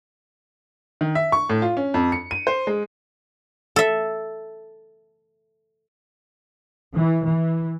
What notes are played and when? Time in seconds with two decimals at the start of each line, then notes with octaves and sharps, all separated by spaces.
1.01 D#3
1.15 E5
1.32 C#6
1.50 A2
1.62 F4
1.77 C#4
1.94 F2
2.12 C#7
2.31 D#7
2.47 C5
2.67 G#3
3.76 A4 E5
6.95 E3
7.26 E3